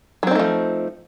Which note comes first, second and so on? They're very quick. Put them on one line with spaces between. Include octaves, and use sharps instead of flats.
F#3 C4 D#4 A3 F3